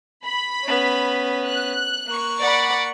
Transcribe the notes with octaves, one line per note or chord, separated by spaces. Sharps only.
B5
B3 C#4
F#6
A#3 C#6
D5 F#5 B5